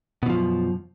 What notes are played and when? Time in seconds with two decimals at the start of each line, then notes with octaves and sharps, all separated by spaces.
0.23 B2
0.26 E3
0.30 F3
0.33 F#2